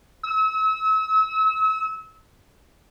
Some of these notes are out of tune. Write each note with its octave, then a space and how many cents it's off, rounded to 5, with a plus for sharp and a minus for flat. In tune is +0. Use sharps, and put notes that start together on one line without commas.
E6 -35